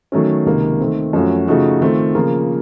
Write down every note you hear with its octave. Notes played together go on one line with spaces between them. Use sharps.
D#3 F#3 A3 C#4
C#2 C3 D#3 A#3
D#3 A3 C4
F#2 F3 A3 C#4 F#4
C#3 F3 A3 D#4 F#4
D#3 A3 C4 F4
C#3 F3 A#3 F4 A#4